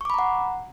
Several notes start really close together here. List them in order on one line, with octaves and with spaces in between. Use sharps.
C#6 D6 B5 A#5 F#5